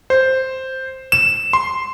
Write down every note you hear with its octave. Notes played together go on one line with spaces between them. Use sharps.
C5
E7
C6